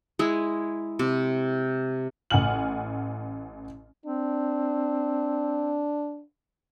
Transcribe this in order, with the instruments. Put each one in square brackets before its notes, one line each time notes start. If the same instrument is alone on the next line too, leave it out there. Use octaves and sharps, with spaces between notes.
[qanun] G#3 E4 G#4
C3
[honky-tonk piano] A1 F#5 G#5 F6 F#7
[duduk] C4 [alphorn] D4